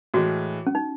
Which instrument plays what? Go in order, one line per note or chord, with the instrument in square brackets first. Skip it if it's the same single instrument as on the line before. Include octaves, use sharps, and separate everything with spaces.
[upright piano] A2 E3 G#3 [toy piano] F#4
[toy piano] C#4
D#4